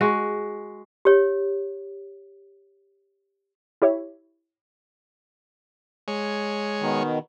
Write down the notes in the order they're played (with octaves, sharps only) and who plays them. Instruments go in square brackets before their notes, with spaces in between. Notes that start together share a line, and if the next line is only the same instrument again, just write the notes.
[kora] G#3 F#4
[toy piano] G4 C#5
[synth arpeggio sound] E4 G4 C#5 E5
[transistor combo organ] G#3 C#5
[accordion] B2 D#3